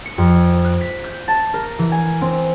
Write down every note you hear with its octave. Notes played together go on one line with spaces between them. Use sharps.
C#7
F2
F#6
B6
G6
A5
A#4
E3
G#5
C4